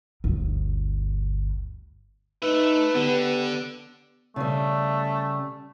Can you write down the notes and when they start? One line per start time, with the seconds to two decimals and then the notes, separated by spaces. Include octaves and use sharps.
0.24 G1 D2
2.43 A3 D#4 B4 E5
2.95 D3 B3 G4
4.36 C#3 G3 A3